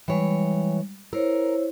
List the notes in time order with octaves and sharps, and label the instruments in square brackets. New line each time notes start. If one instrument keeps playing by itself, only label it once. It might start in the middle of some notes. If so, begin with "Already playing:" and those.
[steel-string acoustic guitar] E3 C#5 [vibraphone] G3 G#3
[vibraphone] E4 C5 C#5 [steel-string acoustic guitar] A#4